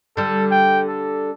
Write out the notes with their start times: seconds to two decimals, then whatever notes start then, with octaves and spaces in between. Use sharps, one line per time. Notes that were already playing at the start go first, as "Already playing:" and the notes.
0.17 D3 G3 A4
0.51 G5
0.89 A4